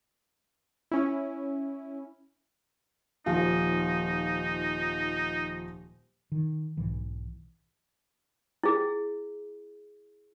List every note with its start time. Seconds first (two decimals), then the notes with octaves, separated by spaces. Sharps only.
0.91 C#4 E4
3.26 D#1 F3 D#4 F5
6.32 D#3
6.77 B1 G#2 B2 E3
8.64 E4 G#4